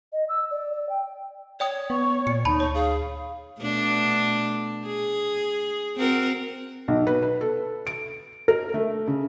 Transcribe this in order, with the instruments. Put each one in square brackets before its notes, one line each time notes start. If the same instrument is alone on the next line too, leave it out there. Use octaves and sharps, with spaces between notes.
[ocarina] D#5
E6
D5
D5
G5
[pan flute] C#5 [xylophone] D5 G5 D#6
[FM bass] B3 [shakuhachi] C#6
[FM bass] A#2 [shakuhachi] D5 [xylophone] C#7
[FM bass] D2 [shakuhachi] D#4 [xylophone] A5 B5
[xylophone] C#5 [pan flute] C#6
[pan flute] G#4 [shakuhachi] F5
[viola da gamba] B2 A3 D4
G#4
C4 F#4 A#4
[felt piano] B1
B4
B4
A4
D7
A#4
A3
C#3